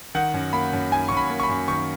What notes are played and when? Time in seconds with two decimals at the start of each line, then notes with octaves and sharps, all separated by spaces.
0.15 D#3 F#5
0.34 F#2
0.53 A#3 B5
0.73 F#2
0.92 D#3 G#5
1.09 F#2 C#6
1.17 B5
1.30 A#3
1.40 C#6
1.43 B5
1.49 F#2
1.68 D#3 C#6